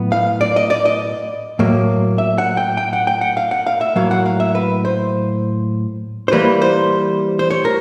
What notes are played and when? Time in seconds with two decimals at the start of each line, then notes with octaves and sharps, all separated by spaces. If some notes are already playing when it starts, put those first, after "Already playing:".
Already playing: A2 F#3 B3
0.12 F5
0.41 D5
0.56 D#5
0.70 D5
0.85 D#5
1.59 A2 F#3 A#3
2.18 E5
2.38 F#5
2.57 G5
2.77 G5
2.93 F#5
3.07 G5
3.21 F#5
3.37 F5
3.51 F#5
3.66 F5
3.81 E5
3.96 A2 F#3 A#3 F5
4.11 F#5
4.26 F5
4.40 E5
4.55 B4
4.85 C5
6.28 C5
6.32 E3 G3 A#3 B4
6.62 C5
7.39 C5
7.51 C#5
7.65 A#4